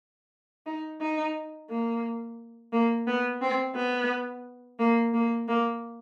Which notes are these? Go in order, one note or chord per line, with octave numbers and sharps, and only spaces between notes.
D#4
D#4
A#3
A#3
B3
C4
B3
A#3
A#3
A#3